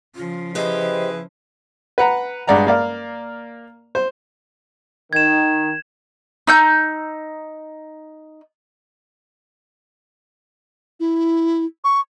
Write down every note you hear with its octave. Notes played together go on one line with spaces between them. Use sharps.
C#3 F3 F4
E4 G4 G#4 B4 C5 D#5
B4 F#5 A#5
G2 G#3 D5 F#5 A#5
A#3 D5 F5
C5
D#3 G#6 E7
D#4 E6 G6
E4
C#6